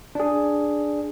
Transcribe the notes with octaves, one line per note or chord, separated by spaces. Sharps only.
D4 G#4